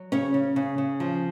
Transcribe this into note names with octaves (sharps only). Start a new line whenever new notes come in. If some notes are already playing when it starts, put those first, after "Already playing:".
Already playing: F#3
C#3 C#4 C#5
C#3
C#3
C#3
F3